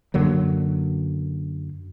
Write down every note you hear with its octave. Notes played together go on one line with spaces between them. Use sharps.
F#2 D3 F#3 A#3